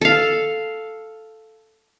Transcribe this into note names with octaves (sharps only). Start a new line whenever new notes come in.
A4 F5